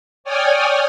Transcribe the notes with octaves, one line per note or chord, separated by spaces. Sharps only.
C#5 D5 G5 G#5 D#6 F6